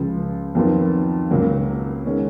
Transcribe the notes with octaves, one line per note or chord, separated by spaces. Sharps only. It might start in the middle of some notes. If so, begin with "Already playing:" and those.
Already playing: C#2 C#3 F3
F2 D#3 F#3 B3 F4
C#2 C#3 F#3 A#3
D#3 G#3 C#4